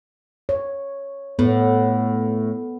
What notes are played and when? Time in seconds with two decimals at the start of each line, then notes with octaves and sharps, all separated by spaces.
0.49 C#5
1.39 A2 B3